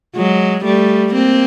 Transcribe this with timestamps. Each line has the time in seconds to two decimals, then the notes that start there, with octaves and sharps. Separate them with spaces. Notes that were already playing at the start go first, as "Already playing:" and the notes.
0.16 F#3 G#3
0.65 G3 A3
1.14 A#3 C4